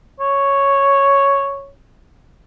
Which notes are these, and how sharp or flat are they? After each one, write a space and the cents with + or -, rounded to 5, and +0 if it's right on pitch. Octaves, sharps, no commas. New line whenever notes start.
C#5 +0